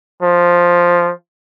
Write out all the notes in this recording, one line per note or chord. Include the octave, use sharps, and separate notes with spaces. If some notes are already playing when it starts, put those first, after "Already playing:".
F3